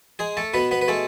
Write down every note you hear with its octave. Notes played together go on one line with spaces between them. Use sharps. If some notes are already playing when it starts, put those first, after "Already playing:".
G#3 G#4
A3 A4
B2 B3 B4
B3 B4
B4
G#3 A3 A4